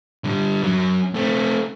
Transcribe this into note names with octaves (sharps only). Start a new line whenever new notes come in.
D3 G3
F#2 F#3
A3 C4